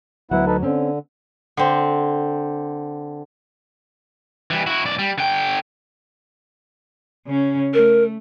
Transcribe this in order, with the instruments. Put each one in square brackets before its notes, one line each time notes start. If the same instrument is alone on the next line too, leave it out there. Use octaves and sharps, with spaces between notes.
[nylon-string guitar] D2 F#3 [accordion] B3 E4 F#5
[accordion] D#4 A4 B4
[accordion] D3 [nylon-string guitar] C4 C#4
[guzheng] D3 C4
[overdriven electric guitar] E3 G3
E4 F#4
B1 D5
G3
D3 G5
[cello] C#3 C#4
[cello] A3 [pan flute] A#4